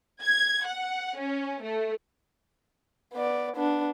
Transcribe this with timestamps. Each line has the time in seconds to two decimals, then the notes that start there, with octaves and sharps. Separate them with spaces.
0.23 G#6
0.66 F#5
1.18 C#4
1.63 A3
3.13 B3 D5
3.56 B3 D4